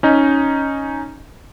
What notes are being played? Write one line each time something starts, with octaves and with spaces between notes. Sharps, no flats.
C#4 D#4